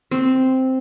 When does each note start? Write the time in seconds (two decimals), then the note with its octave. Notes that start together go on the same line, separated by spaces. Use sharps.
0.11 C4